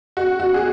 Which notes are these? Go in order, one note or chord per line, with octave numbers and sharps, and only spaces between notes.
F#4
F#4
G#4